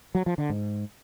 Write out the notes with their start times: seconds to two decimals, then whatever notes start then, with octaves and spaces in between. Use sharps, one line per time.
0.15 F#3
0.26 F3
0.38 D3
0.50 G#2